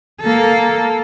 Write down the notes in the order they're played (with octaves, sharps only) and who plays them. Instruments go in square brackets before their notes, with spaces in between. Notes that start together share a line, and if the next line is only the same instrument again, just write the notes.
[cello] A#3 A4